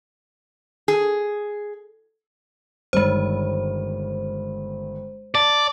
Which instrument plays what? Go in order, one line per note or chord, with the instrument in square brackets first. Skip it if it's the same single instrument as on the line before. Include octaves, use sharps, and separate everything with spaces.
[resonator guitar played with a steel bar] G#4
[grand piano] G1 G2 D#3 [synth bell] G#3 C5
[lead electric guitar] D5 [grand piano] A5